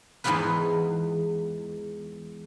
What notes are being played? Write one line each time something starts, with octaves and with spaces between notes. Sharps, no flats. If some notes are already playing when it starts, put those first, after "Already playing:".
E2 G#2 E3 B3 F4 B4